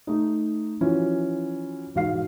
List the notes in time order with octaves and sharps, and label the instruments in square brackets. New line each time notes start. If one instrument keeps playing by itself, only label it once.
[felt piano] A3 D#4
E3 F3 C#4 F4 F#4
E1 G#2 F#4 F5 C7